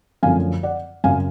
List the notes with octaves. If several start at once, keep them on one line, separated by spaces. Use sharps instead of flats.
F#2 D3 F3 A3 C#4 F5 G#5
D5 F#5
F#2 C#3 F#3 F5 G#5